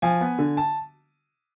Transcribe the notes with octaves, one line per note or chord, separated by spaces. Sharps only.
F3 G#5
B3
D3
A5